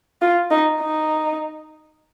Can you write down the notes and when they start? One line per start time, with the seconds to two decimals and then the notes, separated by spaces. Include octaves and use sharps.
0.22 F4
0.51 D#4
0.81 D#4